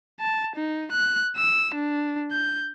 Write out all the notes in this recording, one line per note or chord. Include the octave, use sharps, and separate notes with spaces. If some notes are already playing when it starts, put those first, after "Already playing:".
A5
D#4
F#6
E6
D4
G6